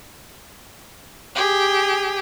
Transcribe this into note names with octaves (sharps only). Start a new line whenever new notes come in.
G4 G#4